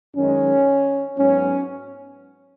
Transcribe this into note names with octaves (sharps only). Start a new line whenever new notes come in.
F#2 D#3 G#3 C#4
G#2 F#3 B3 C#4